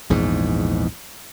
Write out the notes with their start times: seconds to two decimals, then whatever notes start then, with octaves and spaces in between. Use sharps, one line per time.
0.10 A#1 E2 G#2